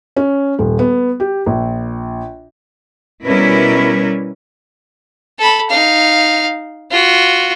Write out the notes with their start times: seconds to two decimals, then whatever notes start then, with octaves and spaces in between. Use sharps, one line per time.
0.16 C#4
0.59 D#1
0.79 B3
1.20 G4
1.46 A#1
3.25 B2 G3 C#4 E4 A#4 B4
5.39 A4 B5
5.69 D#4 F5
6.91 F4 F#4